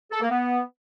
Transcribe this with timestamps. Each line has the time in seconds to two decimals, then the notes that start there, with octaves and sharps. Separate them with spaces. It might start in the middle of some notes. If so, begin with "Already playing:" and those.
0.12 A4
0.21 A#3
0.30 B3